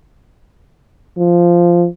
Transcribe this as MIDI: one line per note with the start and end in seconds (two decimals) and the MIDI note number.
1.18 1.87 53